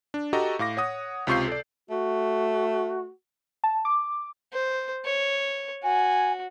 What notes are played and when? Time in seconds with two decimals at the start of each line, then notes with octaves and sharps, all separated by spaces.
0.14 D4
0.33 F#4 G4 A4 D#5 A#5
0.59 A2 F5 D6 A#6
0.77 C#5 F#5 D#6
1.27 C#2 C3 F4 C#6 G6 C7
1.48 A4 D5
1.90 A3 F#4
3.64 A5
3.85 D6
4.53 C5
5.05 C#5
5.83 F#4 G#5